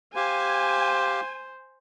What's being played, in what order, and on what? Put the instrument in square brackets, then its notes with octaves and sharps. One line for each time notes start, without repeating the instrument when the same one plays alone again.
[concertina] G4 F5 [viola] C5 [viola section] G#5